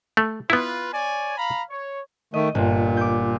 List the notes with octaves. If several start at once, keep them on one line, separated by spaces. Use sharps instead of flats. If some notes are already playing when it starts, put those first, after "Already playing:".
A3
B3 E4 F4 B4
C#5 D5 G#5
F5 A#5 B5
C#5
D#3 A3 D#5
G1 A#2
D6 G6